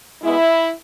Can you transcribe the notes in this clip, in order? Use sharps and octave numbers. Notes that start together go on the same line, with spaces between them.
B2 G#3 B3 E4